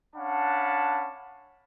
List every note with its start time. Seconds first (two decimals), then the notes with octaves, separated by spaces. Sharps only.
0.16 C#4 D4 F5 F#5 A5 B5